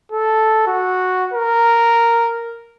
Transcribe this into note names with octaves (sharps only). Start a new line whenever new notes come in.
A4
F#4
A#4